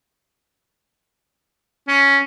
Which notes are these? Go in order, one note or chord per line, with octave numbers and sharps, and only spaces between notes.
C#4